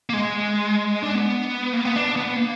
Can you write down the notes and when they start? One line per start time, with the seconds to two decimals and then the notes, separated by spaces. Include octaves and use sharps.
0.10 A#3
0.13 G#3
1.03 D4
1.15 B3
1.73 A#3
1.85 B3
1.96 D4
2.16 B3
2.36 A#3